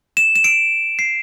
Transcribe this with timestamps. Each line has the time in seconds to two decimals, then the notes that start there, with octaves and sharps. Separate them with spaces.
0.17 E7
0.35 E7
0.44 D7
0.99 C7